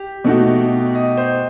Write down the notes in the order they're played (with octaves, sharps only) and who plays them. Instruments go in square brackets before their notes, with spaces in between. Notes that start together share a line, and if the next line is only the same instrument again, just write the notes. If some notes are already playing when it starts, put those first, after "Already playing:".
Already playing: [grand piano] G4
[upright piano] B2 A3 D#4 F#4
[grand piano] D#5
C5